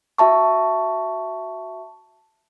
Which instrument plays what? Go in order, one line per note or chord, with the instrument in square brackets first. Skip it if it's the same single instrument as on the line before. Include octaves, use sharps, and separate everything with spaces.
[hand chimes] F#4 E5 A5 C#6